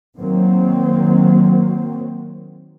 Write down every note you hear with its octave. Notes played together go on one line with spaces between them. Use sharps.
D#3 F#3 A#3 C4